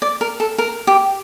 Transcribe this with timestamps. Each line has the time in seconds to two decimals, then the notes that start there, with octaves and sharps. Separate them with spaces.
0.02 D5
0.21 A#4
0.40 A4
0.58 A#4
0.87 G4